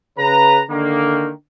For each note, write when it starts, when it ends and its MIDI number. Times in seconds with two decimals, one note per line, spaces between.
0.18 0.61 49
0.18 0.61 71
0.18 0.61 82
0.70 1.30 50
0.70 1.30 51
0.70 1.30 58